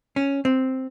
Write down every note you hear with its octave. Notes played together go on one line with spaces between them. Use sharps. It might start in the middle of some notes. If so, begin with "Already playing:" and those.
C#4
C4